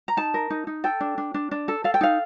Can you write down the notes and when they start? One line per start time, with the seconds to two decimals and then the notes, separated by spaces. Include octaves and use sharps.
0.08 A#5
0.17 D#4 A5
0.34 A#4
0.50 D#4
0.67 D#4
0.84 A4 G5
1.00 D4
1.18 D4
1.34 D4
1.51 D4
1.68 A4
1.84 A4 F5
1.94 G5
2.01 D#4 F5